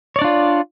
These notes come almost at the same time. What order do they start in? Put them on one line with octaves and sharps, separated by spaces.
C#5 D5 D4 F4